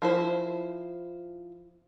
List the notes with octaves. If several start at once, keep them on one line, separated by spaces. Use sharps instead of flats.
F3 E4 C5